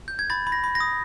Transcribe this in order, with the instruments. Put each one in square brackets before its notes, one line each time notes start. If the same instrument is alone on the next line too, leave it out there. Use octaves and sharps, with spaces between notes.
[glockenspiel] G6
G#6
B5 A6
B5
A#6
B5
A#6
D#6